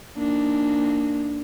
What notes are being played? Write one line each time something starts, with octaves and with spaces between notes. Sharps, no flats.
A#3 D4 D#4